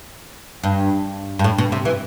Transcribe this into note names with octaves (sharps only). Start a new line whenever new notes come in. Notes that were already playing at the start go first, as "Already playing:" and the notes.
G2
G2
A2
B2
C3
E3